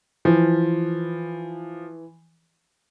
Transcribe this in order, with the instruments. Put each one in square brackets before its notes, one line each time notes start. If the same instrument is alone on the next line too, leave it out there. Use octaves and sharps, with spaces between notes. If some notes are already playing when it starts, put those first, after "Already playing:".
[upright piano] E3 [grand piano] F3